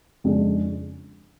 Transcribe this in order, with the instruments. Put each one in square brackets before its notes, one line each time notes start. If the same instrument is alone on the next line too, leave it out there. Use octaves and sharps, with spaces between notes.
[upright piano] F2 C#3 G#3 D4